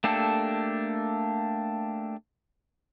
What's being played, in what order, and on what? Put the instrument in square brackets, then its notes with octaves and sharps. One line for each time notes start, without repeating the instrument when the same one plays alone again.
[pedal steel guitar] A3 A#3 D4 G4 A4